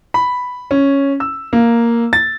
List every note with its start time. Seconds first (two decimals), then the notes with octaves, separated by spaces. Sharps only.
0.14 B5
0.71 C#4
1.20 E6
1.53 A#3
2.13 A6